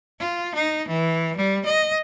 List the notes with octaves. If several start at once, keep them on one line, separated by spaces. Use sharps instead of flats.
F4
D#4
E3
G3
D#5